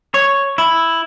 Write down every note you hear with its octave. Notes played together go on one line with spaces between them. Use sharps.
C#5
E4